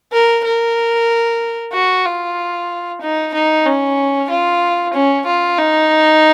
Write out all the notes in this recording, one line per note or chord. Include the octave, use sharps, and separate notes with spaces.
A#4
A#4
F#4
F4
D#4
D#4
C#4
F4
C#4
F4
D#4